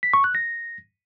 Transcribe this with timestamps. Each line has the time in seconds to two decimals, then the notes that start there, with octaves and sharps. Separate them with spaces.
0.03 B6
0.14 C#6
0.24 F#6
0.35 A#6